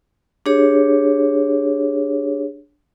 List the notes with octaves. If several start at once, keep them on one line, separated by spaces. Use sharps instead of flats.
D4 G4 G#4 C#5